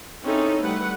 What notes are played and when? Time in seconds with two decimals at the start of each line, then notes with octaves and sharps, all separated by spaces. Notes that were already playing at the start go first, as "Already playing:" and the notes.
0.23 C4 C#4 D#4 E4 G#4 A4
0.62 G3 A3 B4 F#5